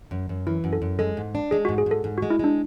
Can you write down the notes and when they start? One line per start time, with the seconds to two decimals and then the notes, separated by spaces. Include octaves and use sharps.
0.11 F#2
0.29 F#2
0.47 E3 E4
0.64 F#2
0.73 A4
0.82 F#2
0.99 G#3 A4
1.17 G#2
1.35 D4
1.51 G#3 G#4
1.65 G#2 F#4
1.78 G#4
1.86 G#2 A4
2.04 G#2
2.18 F#4
2.22 G#3
2.30 E4
2.39 G#3 D4